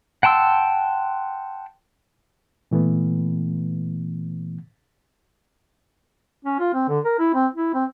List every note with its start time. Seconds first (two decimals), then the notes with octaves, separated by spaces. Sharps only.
0.23 F#5 G5 A5 C6 E6
2.71 A#2 E3 A3 B3
6.45 C#4
6.59 F4
6.74 C4
6.89 D3
7.04 A#4
7.19 E4
7.34 C4
7.55 E4
7.74 C4